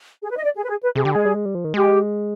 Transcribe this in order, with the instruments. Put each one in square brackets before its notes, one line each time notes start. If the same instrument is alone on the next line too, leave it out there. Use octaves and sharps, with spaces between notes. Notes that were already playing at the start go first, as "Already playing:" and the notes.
[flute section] G#4
B4
D#5
D5
G#4
B4
G#4
B4
[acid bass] C3 [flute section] G#4
[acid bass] D3 [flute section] G4
[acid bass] G#3 [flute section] G#4
[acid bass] G3
G#3
G3
F3
D#3
[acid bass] G#3 [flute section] G4